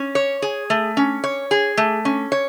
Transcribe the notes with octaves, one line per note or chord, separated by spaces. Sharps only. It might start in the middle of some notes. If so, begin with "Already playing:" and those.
Already playing: C#4
C#5
G#4
A3
C#4
C#5
G#4
A3
C#4
C#5